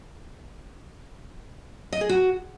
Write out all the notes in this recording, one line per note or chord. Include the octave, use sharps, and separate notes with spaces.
D#5
G#4
F#4